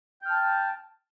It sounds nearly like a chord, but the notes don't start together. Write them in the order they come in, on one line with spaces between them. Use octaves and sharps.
G5 F6 A5